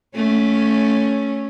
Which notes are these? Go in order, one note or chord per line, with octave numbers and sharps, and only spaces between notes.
A3 C#4